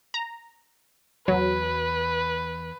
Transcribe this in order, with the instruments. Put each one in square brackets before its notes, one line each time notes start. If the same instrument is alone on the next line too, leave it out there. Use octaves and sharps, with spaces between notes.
[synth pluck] A#5
[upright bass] E2 [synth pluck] F#3 [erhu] B4